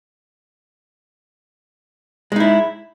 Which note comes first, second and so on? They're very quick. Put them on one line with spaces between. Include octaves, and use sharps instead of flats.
G#3 D#4 E4